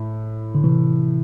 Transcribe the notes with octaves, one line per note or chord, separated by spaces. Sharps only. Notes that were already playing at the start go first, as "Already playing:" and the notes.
Already playing: A2
D3
C3 E3